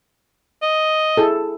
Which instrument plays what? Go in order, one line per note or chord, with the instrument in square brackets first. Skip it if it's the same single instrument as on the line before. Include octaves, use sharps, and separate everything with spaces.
[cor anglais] D#5
[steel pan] E4 G#4 A4